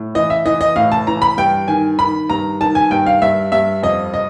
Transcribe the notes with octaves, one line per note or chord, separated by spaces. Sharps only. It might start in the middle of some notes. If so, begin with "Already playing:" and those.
Already playing: A2
E3 D#5
E5
E3 D#5
D#5
A2 F5
A5
E3 A#5
B5
G2 G5
D#3 G#5
D#3 B5
G2 A#5
D#3 A5
G#5
G2 G5
F5
G2 E5
G2 E5
F2 D#5
D#5